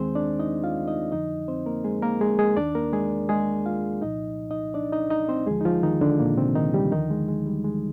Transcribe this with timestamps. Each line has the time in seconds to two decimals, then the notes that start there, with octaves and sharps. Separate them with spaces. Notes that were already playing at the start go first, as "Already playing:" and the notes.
Already playing: D#2 D#3 G#3 C4 G#4 C5
0.15 D4 D5
0.39 D#4 D#5
0.64 F4 F5
0.88 D#4 D#5
1.12 F2 D3 F3 D#4 D#5
1.48 C4 C5
1.66 A#3 A#4
1.85 G#3 G#4
2.03 A#3 A#4
2.21 G#3 G#4
2.39 G#3 G#4
2.57 D#2 D#3 D4 D5
2.75 A#3 A#4
2.93 G#3 G#4
3.29 G#3 G#4
3.66 F4 F5
4.02 C2 A#2 F3 D#4 D#5
4.50 D#4 D#5
4.74 D4 D5
4.92 D#4 D#5
5.11 D#4 D#5
5.29 C4 C5
5.47 D#2 D3 F3 G#3 G#4
5.61 D#4
5.65 F3 F4
5.83 D#3 D#4
6.01 D3 D4
6.19 A#2 A#3
6.37 C3 C4
6.56 D#3 D#4
6.74 G3 G4
6.92 D#2 D3 D#3 F3 D#4
7.10 G#3
7.28 G#3
7.46 G3
7.64 G#3